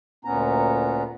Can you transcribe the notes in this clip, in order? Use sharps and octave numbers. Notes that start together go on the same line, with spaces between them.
D2 A#2 B3 C#4 A#5